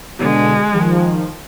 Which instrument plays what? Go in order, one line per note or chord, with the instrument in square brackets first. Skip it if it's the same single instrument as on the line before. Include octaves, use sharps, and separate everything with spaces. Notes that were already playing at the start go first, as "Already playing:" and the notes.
[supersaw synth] B2 D3 [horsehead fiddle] G#3
[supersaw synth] D#3 F3